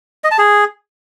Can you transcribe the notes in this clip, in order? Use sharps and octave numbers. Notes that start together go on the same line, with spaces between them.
D#5
A5
G#4